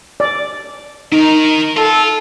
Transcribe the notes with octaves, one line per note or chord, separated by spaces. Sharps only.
D5
D#3 D#4 A#4
F4 A4